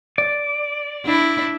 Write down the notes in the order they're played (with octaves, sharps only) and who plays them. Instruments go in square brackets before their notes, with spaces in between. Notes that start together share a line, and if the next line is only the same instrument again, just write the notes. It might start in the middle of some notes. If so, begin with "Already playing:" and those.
[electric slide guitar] D5
[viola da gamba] D4 E4